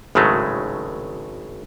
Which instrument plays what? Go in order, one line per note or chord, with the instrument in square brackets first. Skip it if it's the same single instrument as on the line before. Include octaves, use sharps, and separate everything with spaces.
[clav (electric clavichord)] G#1 A2 C#3 F#3 G#3 A3